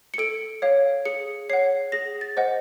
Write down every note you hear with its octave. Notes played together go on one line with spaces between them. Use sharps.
C#7
A4 D7
C#5 F5
G#4 C#7
C#5 F#5 C7
G#4 A#6
A6
C5 D#5 F#5